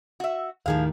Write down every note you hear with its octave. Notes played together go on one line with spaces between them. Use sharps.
F#4 E5
D#2 A2 D#3 F3 G#4 F5